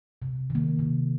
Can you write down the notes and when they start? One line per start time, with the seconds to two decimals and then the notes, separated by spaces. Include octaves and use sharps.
0.22 C3
0.50 D#3 A#3
0.79 C3